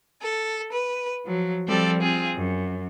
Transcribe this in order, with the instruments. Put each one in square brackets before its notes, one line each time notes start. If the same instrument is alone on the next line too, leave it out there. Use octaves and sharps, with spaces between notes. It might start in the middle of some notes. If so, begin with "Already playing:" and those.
[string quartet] A4
B4
F3 F#3
F3 G3 C4 A4 D5
C4 F4 G#4
F#2